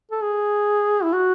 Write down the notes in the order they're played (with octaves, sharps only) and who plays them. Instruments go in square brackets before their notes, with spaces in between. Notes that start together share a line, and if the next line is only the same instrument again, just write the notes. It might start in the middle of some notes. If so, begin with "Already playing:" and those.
[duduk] A4
G#4
E4
F#4